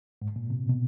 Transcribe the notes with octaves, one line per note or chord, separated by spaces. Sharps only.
G#2
A#2
C3
B2